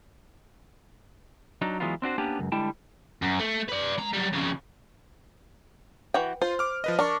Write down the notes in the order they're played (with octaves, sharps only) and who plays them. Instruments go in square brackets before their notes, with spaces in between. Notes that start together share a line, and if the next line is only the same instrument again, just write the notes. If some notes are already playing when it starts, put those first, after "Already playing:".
[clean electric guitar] F#3 D4 D#4
E3 F#3 G#3 B3 F4
C4 D4 F#4 C5
A#3 B3 C#4 D4 G4
C#2 F#2
D3 G3 G#3 E4 G5 A5
[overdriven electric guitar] F#2
A3
B4 D5
G#3 A#5
F#3 G3
F2 C#3
[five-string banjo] E3 F#4 G5
[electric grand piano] F4 [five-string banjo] C5
[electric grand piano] D6 F6
F3 B4 D#5
[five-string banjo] D4 [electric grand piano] A#4 A5 C#6